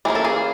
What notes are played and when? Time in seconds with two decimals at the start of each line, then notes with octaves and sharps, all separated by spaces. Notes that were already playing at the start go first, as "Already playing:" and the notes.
0.05 E3 G3 A#3 C#4 G#4
0.15 A4
0.25 G#4